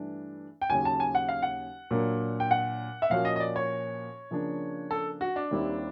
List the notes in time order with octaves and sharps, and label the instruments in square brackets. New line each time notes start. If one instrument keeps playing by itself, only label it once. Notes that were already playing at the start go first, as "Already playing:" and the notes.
Already playing: [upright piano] G2 E3 A3 D4
[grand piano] G5
[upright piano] D#2 C#3 F#3 [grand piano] G#5
[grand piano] A5
G#5
F#5
F5
F#5
[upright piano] A#2 F#3 A#3 D4
[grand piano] G5
F#5
E5
[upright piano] A#2 F3 A#3 C#4 F#4 [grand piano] F5
[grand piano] D#5
D#5
D5
C#5
[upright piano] C#3 F3 A#3 D4
[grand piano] A4
F#4
D4
[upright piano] D#2 D#3 G3 C4 E4